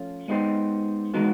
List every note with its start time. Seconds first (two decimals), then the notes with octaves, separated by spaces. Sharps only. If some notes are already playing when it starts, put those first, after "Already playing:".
Already playing: F3 A3 C#4 F4
0.28 G#3 B3 D#4 G4 C5
1.14 E3 G#3 B3 D#4 F#4